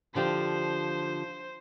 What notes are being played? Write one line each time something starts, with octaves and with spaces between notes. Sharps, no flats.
D3 F3 G4 C5